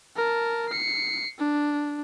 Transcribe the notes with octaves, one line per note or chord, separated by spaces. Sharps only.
A#4 A5
C7 C#7
D4